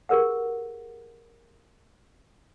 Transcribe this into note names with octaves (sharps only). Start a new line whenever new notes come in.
G4 G#4 A#4 B4 F#5